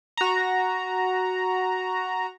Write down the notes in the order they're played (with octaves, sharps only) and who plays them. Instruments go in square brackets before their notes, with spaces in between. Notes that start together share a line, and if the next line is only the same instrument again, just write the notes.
[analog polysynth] F#4 A#5